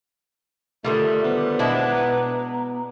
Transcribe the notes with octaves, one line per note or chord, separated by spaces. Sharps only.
D3 D#3 G3 A3 F4 E5
B3 C5
B2 G#3 D4 E4
A#5